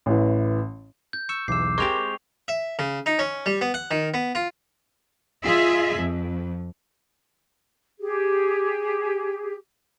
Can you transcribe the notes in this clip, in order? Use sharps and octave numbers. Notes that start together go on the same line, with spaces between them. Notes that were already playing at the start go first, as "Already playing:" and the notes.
A1 E3
G6
C#6 E6
B1 E2 D6 E6 C7
G#3 C4 G4 A#4 C#6 F7
E5
C#3
D#4
C#4
G3
B3
F#5
D#3
B3
F4
F4 G#4 D#5 E5
F2
G4 G#4